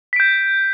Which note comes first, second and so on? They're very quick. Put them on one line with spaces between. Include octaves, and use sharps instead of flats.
B6 D7 G6